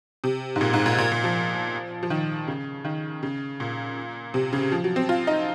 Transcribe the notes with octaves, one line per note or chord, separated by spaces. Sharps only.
C3
G#2
A#2
G#2
A#2
A#2
A#2
F3
F3
D#3
C#3
D#3
C#3
A#2
C3
C#3
F3
F#3
C4
F4
D#4